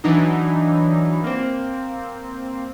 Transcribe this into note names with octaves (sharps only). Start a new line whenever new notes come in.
E3 F#3 D4 D#4
A#3 C4